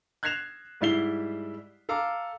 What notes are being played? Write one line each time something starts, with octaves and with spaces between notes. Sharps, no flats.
F#6 G#6 A#6 C7 E7 F7
G#2 G3 E4 C7 G7
A4 F5 A#5 D6